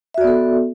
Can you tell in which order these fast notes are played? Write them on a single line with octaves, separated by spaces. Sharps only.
E5 F#4 D5 B3 A4